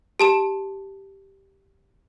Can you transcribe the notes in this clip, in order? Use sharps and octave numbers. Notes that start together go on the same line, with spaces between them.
G4 A5 E7